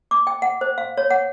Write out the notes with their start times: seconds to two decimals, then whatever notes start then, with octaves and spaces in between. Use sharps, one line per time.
0.11 D6
0.27 G5
0.42 F#5
0.61 C5
0.78 F5
0.97 C#5
1.11 F#5